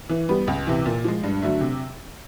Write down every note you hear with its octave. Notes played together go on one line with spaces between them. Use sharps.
E3
G3 B3
C#2
C3 E3
A#2
F3 G#3
G2
D3 F#3 A3
C3